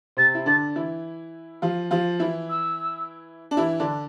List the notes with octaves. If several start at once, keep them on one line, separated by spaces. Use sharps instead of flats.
C3 C4 A6
E4
D3 D4 A6
E3 E4
F3 F4
F3 F4
E3 E4
E6
D4
E3 E4
D3 D4